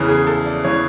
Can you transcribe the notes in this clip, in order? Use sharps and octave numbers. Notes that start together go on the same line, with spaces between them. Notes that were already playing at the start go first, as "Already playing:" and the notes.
Already playing: E2 C#3 E3
G#4
A4
D5
C#3 E3 C#5